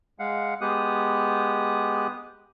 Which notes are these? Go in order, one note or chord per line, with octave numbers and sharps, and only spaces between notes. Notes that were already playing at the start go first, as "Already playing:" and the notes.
G#3 F5 F#5
G#3 B3 G4 D#6 F#6